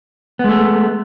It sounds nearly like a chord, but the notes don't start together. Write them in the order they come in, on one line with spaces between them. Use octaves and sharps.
B3 G#3 A3